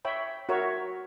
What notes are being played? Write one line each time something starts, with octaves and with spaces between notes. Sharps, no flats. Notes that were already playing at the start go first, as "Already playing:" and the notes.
C#5 E5 G5 B5
F#4 A#4 C#5 E5